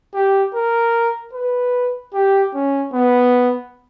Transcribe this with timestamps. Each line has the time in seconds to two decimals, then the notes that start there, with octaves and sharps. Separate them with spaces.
0.14 G4
0.54 A#4
1.33 B4
2.14 G4
2.54 C#4
2.93 B3